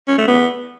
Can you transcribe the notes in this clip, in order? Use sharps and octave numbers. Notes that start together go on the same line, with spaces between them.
C#4
A3
B3